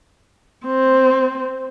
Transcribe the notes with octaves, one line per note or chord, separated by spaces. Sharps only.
C4